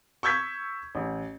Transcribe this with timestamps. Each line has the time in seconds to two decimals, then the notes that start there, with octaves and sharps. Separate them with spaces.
0.23 C#6 E6 G6 G#6 B6
0.95 A1